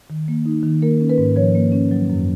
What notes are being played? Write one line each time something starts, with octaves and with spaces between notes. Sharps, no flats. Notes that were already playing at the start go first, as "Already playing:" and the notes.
D#3
A#3
D#4
D#3
A#3 A#4
C#4
B4
G#2
F3 C#5
A#3
C#4
F#3
F#2